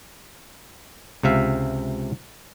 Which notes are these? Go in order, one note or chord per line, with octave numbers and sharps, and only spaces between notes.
C#2 C3 E5 F5